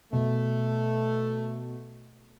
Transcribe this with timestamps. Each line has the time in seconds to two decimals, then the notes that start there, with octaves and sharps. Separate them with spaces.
0.13 B2 A3